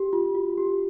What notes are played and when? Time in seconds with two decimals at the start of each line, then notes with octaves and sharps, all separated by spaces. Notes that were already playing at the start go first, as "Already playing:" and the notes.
Already playing: G4
0.13 F4
0.35 F#4
0.57 G4